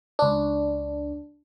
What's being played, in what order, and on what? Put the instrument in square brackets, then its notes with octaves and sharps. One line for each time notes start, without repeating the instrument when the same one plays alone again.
[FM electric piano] C#2 D4